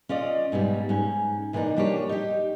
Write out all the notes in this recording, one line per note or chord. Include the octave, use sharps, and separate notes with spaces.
C#4 F4 D5 D#5
G#2 B2 F#3 G3
G#2 C#4
C3 E3 A#3 D4 D#4
G3 A#3 D4 F4 G4 C#5
D#4 G4